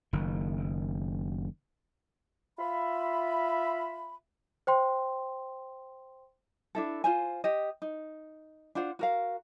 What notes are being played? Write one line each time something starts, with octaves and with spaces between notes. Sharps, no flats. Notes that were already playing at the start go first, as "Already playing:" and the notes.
F#1 D#3
F4 E5 B5
C5 G5 C6
D4 E4 A4
F4 C5 G#5
G4 D#5
D#4
D4 F4 C5 F#5
F#4 A#4 F5